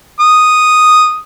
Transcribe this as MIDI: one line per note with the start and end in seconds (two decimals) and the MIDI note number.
0.20 1.18 87